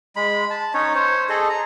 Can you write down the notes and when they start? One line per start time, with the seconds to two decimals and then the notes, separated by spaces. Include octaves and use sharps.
0.16 G#3 B5
0.50 A5
0.74 C#4 D#4 C#5
0.95 C5 C#5
1.29 G#4 A4 D#5
1.50 A#5